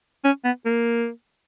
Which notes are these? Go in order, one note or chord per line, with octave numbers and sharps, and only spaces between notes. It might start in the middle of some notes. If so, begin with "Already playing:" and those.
C#4
B3
A#3